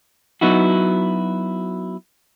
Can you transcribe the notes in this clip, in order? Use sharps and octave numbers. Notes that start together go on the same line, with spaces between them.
F#3 B3 D#4 E4 F#4